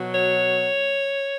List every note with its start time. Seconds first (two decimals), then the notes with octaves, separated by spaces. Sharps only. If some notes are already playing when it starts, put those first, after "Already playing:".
Already playing: B2 F#3
0.15 C#5